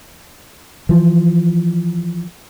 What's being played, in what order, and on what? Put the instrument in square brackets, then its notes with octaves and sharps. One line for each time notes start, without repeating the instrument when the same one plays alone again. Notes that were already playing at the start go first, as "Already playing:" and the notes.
[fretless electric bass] E3 F3